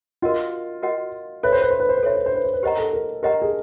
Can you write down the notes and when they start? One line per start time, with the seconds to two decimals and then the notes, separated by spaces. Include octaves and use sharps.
0.22 F4 F#4 A#4 D#5 F#5
0.83 F#4 A#4 D#5 F#5
1.43 A4 B4 C#5 E5
1.52 C5
1.62 B4
1.71 C5
1.80 B4
1.89 C5
1.98 B4
2.03 A4 C5 C#5 E5
2.17 B4
2.26 C5
2.35 B4
2.44 C5
2.54 B4
2.63 G4 A#4 C5 D#5 F#5 A#5
2.78 A4
2.93 A#4
3.23 G4 A#4 C5 D#5 F#5 A#5
3.42 G#4